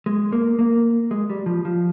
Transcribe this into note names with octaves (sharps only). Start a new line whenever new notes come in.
G#3
A#3
A#3
G#3
G3
F3
F3